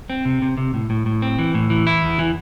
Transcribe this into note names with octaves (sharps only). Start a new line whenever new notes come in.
C4
C3
C3
C3
A2
A2
A2
C4
E3
A2
E3
E4
E2
E3